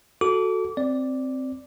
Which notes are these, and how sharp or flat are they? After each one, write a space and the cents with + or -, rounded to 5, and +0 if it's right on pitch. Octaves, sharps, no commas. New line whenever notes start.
F#4 +0 A4 +0 D6 -30
C4 +0 D5 -5